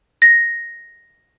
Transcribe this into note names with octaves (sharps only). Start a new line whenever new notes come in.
A#6